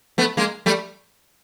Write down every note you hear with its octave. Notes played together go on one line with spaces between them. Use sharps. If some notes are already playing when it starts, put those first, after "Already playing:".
A3 B3
G#3 A#3
G3 A3